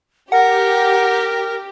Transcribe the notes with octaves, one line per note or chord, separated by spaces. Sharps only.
G4 A#4 F#5